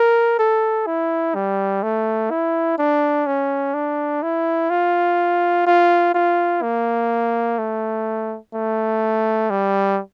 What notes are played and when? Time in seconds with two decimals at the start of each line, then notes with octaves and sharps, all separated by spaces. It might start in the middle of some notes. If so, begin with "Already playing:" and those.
Already playing: A#4
0.39 A4
0.87 E4
1.35 G3
1.83 A3
2.31 E4
2.78 D4
3.27 C#4
3.74 D4
4.23 E4
4.70 F4
5.66 F4
6.14 F4
6.62 A#3
7.58 A3
8.54 A3
9.50 G3